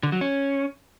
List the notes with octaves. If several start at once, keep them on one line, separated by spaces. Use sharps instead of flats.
D3
F#3
C#4